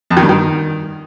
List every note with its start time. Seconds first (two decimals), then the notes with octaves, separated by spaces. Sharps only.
0.10 F2
0.17 D#3
0.23 G2
0.29 D#3